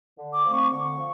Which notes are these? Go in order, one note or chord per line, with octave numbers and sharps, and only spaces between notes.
D3
D6
F3 A3 C4
C#6
D3 C#6
F3